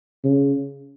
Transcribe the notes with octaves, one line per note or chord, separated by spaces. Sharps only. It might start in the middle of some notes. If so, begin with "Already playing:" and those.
C#3